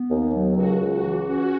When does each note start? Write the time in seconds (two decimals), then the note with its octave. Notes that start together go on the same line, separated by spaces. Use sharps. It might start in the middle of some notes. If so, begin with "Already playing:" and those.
Already playing: B3
0.11 D#2
0.34 F#3
0.57 C#2 F#4
0.80 C#2
0.91 F#4
1.03 E3
1.27 C#4 F#4